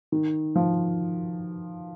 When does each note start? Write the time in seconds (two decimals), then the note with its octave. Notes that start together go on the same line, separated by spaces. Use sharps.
0.12 D#3
0.56 F3